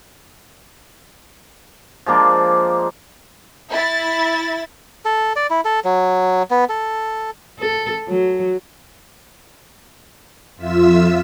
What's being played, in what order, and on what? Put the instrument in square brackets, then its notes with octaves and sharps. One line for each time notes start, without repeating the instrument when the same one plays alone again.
[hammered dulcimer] F3 G#3 A#3 D4
[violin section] E4 A6
[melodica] A4
D5
E4
A4
F#3
B3
A4
[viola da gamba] A4
F#3
[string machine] F2 F4 E5 E6